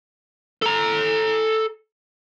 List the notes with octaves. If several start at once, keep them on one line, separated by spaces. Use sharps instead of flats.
A4 A#5